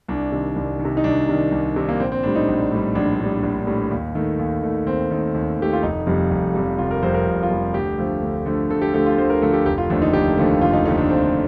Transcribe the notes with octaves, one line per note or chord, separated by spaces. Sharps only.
C2 D4
C3 D#3
C2
D#3
C3
D#4
C2 D4
C3 D#3
C2
C3 D#3
A#3
A#1 C4
C4
A2 G3 D4
D#4
A#1
A2 G3
A#1 D4
A2 G3
A#1
A2 G3
D#2
D#3 A3
D#2
D#3 A3
D#2 C4
D#3 A3
D#2
D#3 A3 G4
F4
F1 D#4
F2 C3 G3
F1
F2 C3 G3
F1 F4
A#4
F2 C3 G3 C5
A#4
F1
F4
F2 C3 G3
D2 G4
D3 F3 A3
D2
D3 F3 A3
D2 A4
G4
D3 F3 A3 G4
F4
D2 C5
A#4
D3 F3 A3 A4
G4
F1 G4
F4
D#2 D3 F3 A3 D4
D#4
F1 G4
D#2 D3 F3 A3
F1 F4
D#4
D#2 D3 F3 A3 D#4
D4
F1 C4